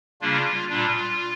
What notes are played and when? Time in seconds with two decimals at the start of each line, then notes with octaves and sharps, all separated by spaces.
0.21 C#3 G3 A#3 D4 F4
0.69 A#2 G3 D4 F4